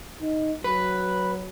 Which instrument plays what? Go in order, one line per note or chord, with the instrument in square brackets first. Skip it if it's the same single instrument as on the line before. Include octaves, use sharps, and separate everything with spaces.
[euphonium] D#4
[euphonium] F#3 [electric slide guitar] B4